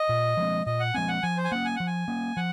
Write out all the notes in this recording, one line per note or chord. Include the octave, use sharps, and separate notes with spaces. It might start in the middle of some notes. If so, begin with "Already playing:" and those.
Already playing: D#5
A#2
F3 G#3 C4
A#2 D#5
F#5
F3 G#3 C4 G#5
F#5
F3 G#5
C5
G#5
A#3 C#4 F#5
G#5
F3 F#5
G#5
A#3 C#4
F3 F#5